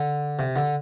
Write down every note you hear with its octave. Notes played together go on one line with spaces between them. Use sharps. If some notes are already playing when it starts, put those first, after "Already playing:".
Already playing: D3
C3
D3